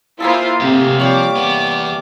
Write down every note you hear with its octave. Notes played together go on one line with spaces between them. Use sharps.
A#3 E4 F4 G#4 A4 C5
C3 A3 G4
F3 G3 C#5 D6
E2 B3